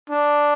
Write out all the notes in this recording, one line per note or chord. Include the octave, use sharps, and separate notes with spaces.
D4